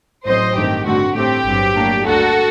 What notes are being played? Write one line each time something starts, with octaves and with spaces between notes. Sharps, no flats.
A1 A2 F#3 C4 C5 D#5
G2 D#3 A3 C4 G4
G2 D3 A3 C4 F#4
A2 A3 C4 G4
G1 G2 F#3 C4
A2 F#3 A#3 D4
D2 D3 G3 A#3 F#4 A4